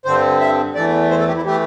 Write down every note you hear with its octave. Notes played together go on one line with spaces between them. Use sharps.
G2 D3 C4 C5
E5
E2 E3 A3 D5
C5
A4
G4
E4
E3 A3 G4